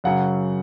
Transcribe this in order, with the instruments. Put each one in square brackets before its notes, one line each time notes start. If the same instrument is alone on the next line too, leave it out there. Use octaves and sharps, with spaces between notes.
[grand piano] F#2 C#3 F#3 F#5